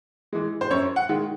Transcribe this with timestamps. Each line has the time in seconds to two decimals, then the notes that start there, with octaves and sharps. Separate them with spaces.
0.33 E3 G#3
0.61 C5
0.71 F#2 C#5
0.96 F#5
1.09 D#3 G#3